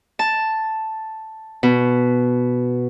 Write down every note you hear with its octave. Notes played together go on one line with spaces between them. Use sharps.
A5
B2